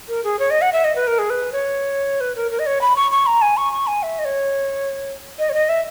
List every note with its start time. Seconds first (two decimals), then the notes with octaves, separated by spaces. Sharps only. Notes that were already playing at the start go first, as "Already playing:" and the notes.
0.09 A#4
0.24 G#4
0.39 C#5
0.51 D#5
0.62 F#5
0.73 E5
0.84 D#5
0.96 B4
1.07 A#4
1.19 G#4
1.30 B4
1.53 C#5
2.21 B4
2.36 A#4
2.51 A#4
2.59 D#5
2.66 C#5
2.81 B5
2.96 C#6
3.12 C#6
3.26 A#5
3.42 G#5
3.57 C#6
3.72 C#6
3.87 G#5
4.03 E5
4.19 D#5
4.25 C#5
5.39 D#5
5.49 C#5
5.54 D#5
5.69 E5